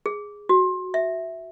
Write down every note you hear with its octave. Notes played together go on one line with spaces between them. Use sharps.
G#4
F#4
E5